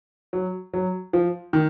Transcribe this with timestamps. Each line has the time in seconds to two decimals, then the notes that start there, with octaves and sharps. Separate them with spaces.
0.33 F#3
0.73 F#3
1.13 F3
1.53 D#3